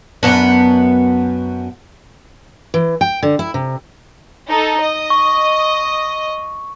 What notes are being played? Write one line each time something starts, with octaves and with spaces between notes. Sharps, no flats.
F#2 B3 D4
E3
G5
D3
E4
C3
D#4 A4
D#5
C#6